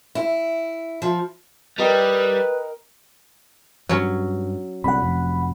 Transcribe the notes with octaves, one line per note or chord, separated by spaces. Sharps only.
E4
F3
G3 A#4 B4 D#5 G5
G2 F#3 C#4
C2 D3 F#5 B5
F1